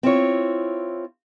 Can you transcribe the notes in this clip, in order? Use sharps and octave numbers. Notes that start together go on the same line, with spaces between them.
C4 E4 F4 C#5